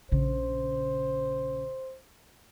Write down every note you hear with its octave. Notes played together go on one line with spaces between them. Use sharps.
A#1 C#3 C5